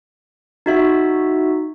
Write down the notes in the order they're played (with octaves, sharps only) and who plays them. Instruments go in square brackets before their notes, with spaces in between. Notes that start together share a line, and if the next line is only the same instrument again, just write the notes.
[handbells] D#4 F#4 E5